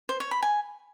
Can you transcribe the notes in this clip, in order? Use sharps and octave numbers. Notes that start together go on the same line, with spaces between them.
C5
C#5
B5
G#5